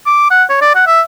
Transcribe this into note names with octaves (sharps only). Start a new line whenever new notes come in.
D6
F#5
C#5
D5
F#5
E5